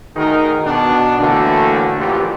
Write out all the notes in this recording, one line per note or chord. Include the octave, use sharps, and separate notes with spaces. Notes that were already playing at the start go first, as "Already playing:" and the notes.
D2 D#3 D#4 F#4 G#4 A#4
B2 D4
A2 D3 E3 A3 A#3 F#4
A1 F2 A#2 E3 F4 G4